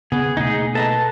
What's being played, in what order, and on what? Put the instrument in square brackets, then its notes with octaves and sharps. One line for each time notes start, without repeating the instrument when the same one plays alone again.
[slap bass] C#3 [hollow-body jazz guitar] B3 [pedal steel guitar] G#4
[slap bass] B2 A3 A#3 [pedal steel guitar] D#4 G#4
[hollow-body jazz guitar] A4 D#5 A#5 [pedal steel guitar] B4 A5